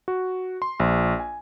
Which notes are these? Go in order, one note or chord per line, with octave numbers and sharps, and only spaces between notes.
F#4
C6
A#1
G#5